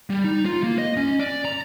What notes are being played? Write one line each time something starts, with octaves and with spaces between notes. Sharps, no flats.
G3
D#4
F4
A#3
D#5
C#4
D5
A#5